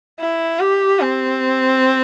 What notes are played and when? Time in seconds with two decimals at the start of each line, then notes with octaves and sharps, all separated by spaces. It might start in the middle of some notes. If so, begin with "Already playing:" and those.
0.20 E4
0.60 G4
1.00 C4